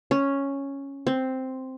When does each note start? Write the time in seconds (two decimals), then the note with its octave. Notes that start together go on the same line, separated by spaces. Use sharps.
0.11 C#4
1.07 C4